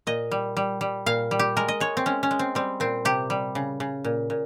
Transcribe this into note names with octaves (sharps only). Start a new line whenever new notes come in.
A#2 D#5
G3
G3
G3
A#2 F5
G3
G4
G#3 A#4
D#5
G#3 C#5
C4
G#3 C#4
C#4
G#3
C4
G3 C4
A#2 C4
C3 G4
G3
C#3
C#3
A#2
A#2